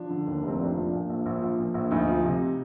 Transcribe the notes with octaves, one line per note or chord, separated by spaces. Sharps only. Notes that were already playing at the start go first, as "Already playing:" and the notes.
Already playing: F3 D4
D3
D#2
F1 C4
A#1 D4
F3
A#2
A#1
A#1
F3
A#2
A#1
D2 D#4
F3
C3